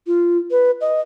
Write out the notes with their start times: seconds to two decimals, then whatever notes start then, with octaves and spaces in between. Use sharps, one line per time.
0.07 F4
0.51 B4
0.81 D#5